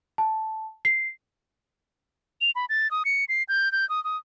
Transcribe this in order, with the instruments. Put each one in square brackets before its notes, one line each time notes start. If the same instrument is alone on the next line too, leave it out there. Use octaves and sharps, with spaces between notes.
[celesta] A5
C7
[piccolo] F7
B5
A6
D#6
C#7
C7
G6
G6
D#6
D#6